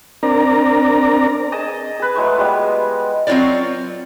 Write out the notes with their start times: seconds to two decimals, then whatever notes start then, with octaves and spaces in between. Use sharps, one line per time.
0.23 C4 D4 A#4 D5 A#5
1.52 G#4 D#5 A5
2.00 G#4 B4
2.16 F#3 G#3 A3 C#6
2.37 G3 G#3 B3 F4
3.27 F#3 C4 E4 F4 C#5 D5